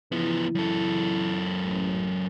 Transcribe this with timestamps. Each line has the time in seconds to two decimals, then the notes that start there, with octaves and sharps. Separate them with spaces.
0.12 C#3 E3 F3 B3 E4
0.55 F#2 A4
1.63 A1